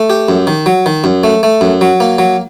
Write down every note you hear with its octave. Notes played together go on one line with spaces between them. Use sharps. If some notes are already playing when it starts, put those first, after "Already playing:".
Already playing: A3
G4
F#2
D#3
F#3
D#3
F#2
A3
A3
F#2
F#3
A#3
F#3